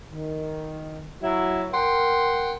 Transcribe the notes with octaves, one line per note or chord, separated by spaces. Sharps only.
D#3
F#3 E4
A#4 F#5 G5 C6